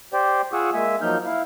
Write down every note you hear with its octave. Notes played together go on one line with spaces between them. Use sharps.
G4 C5 D5 G5
F4 G#4 F#5 C#6 D#6 E6
G#3 A#3 E5 G#5
F3 F#3 A#3 D#4 F6 G6
E4 F5